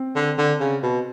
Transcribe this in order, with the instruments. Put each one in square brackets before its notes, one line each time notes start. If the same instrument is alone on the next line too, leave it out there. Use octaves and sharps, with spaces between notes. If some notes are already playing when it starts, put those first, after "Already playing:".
Already playing: [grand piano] C4
[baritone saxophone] D3
D3
C#3
B2